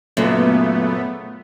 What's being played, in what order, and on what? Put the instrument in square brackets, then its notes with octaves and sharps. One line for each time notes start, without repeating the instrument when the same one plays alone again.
[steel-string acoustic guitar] F#2 A#2 C#3 [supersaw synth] A3 B3